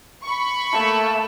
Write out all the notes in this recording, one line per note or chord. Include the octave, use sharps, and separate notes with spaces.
B5 C#6
A3 A#3 A5